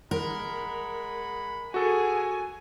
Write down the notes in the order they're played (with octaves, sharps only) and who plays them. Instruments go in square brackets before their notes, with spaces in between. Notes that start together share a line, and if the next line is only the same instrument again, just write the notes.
[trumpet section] G#3 F#5 B5 [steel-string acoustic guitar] A#4
[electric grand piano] F#4 A4 [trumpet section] G#4 [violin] G#5